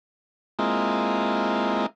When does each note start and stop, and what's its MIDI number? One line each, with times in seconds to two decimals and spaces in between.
0.59 1.86 56
0.59 1.86 58
0.59 1.86 60
0.59 1.86 64
0.59 1.86 65
0.59 1.86 75